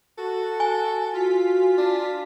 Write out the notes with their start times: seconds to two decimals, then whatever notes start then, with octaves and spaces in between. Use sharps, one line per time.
0.18 F#4 A4
0.60 G#5
1.13 F4 F#4 B6
1.78 D4